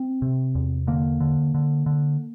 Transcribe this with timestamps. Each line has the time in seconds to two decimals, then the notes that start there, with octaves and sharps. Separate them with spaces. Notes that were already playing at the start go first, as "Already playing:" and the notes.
Already playing: C4
0.22 C3
0.55 E2
0.87 D3 A#3
1.20 D3
1.55 D3
1.86 D3